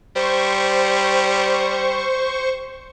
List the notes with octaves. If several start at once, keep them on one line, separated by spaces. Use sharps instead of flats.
G3 C5 C#6